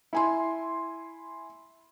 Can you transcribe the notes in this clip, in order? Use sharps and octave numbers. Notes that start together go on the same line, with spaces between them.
E4 G#5 C6